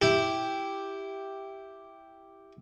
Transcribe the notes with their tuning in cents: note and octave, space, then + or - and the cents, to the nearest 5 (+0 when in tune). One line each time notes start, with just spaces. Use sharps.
E4 +0 G4 +0